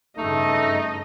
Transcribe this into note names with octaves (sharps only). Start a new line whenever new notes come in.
G2 C#3 A3 D#4 D#5